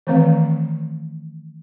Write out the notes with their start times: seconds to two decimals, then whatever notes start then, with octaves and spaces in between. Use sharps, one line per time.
0.07 D#3 E3 A3 C4 B4 F5